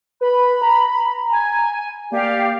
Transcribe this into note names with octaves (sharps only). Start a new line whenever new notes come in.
B4 B5
A#5
G#5
A#3 G4 D5 F5